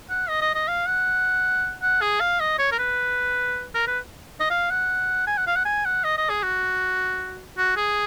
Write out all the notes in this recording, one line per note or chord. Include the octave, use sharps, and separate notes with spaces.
F#5
D#5
D#5
D#5
F5
F#5
F#5
G#4
F5
D#5
C#5
A#4
B4
A#4
B4
D#5
F5
F#5
G#5
F#5
F5
F#5
G#5
F#5
D#5
D#5
G#4
F#4
F#4
G#4